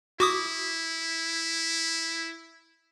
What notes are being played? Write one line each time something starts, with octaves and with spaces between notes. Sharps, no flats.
E4 F#4 D6 D#6